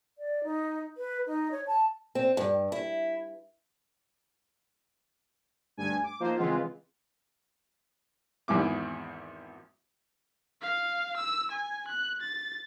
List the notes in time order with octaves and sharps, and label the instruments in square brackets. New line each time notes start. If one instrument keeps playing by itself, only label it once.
[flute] D5
D#4
B4
D#4
C#5
A5
[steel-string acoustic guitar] C4
G2
E4
[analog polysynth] D2 G2 G#5
D6
F3 A#3 D#4 C5
C#3 E3 G#3 B3 C4 F4
[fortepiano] G#1 E2 G#2 E4 D6
[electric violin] F5
E6
G#5
F#6
A6